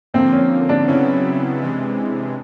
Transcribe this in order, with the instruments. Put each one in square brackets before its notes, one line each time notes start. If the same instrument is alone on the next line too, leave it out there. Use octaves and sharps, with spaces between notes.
[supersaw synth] D3 F3 A#3 [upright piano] C4
[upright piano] C#4
D4
[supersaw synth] C#3 F#3 B3 E4 [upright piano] C#4
[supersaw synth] C3 E3 G#3